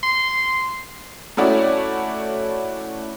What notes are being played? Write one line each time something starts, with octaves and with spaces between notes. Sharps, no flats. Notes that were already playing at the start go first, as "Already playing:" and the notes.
C6
A3 C#4 E4 F#4 D5